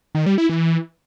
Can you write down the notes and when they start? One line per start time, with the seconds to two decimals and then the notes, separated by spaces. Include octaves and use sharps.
0.15 D#3
0.26 G3
0.38 E4
0.49 E3